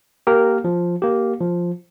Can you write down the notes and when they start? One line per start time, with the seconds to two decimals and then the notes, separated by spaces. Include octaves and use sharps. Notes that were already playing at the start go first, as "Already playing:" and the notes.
0.27 A#3 G4 A#4
0.64 F3
1.02 A#3 G4
1.40 F3